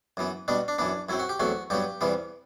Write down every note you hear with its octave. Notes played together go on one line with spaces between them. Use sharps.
F#2 E3 B3
B2 G3 B3 D4
D4
F#2 E3 B3 D4
F#2 F#3 C4 E4
F#4
G4
E2 C3 F#3 A3 F#4
G2 F#3 B3 G4
E2 C3 E3 G3 B3